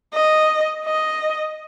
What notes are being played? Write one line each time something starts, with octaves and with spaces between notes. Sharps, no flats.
D#5
D#5